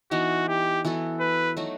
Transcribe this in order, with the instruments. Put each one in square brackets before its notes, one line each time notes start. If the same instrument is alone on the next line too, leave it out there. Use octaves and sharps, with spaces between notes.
[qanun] E3 B3 D#4 [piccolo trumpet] F#4
[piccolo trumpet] G4
[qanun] E3 B3 F#4 A4
[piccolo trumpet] B4
[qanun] F#3 A3 D#4 F#4